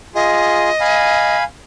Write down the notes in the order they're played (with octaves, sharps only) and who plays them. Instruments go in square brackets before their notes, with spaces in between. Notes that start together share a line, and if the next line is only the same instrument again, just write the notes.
[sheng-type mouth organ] F4 G#4 [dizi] D#5
[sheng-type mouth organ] F5 G#5 B5